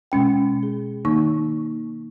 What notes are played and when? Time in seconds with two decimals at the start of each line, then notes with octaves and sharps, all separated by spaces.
0.12 B2 G#3 C#4 G5
0.63 G#4
1.05 D#3 A#3 D#4 C#6